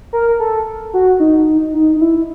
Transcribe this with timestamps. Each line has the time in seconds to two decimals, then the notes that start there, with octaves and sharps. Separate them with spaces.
0.13 A#4
0.40 A4
0.94 F#4
1.20 D#4
1.74 D#4
1.96 D#4
2.01 E4